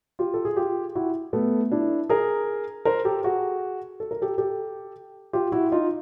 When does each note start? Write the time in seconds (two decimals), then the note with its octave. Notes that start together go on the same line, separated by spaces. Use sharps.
0.19 F4 G4
0.34 A4
0.45 G#4
0.57 F4 G4
0.95 E4 F#4
1.33 A3 B3
1.71 D4 E4
2.09 G#4 A#4
2.85 A#4 C5
3.05 G4 A4
3.24 F#4 G#4
4.00 A4
4.11 A#4
4.22 G4 A4
4.38 G4 A4
5.33 F4 G4
5.52 E4 F#4
5.72 D#4 F4